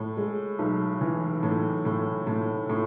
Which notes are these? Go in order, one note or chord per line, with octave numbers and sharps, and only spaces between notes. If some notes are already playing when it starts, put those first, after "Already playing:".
Already playing: A2
G#3
B1
E3
A2
A2
A2
A2